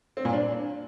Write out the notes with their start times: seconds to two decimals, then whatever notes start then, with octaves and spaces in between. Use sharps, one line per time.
0.17 C4
0.25 A#2
0.33 D4